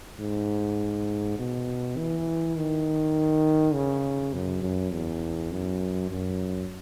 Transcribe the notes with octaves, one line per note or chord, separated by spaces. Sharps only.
G#2
B2
E3
D#3
C#3
F#2
F#2
E2
F#2
F#2